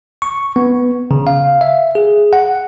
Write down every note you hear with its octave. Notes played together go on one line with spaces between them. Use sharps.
C#6
B3
C#3
F5
E5
G#4
F#5